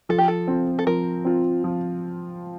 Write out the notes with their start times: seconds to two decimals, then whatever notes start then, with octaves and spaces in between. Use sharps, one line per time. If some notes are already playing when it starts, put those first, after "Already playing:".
0.09 F3 A4
0.18 G4
0.28 A4
0.48 C4 F4
0.79 A4
0.87 F3 A#4
1.25 C4 F4
1.64 F3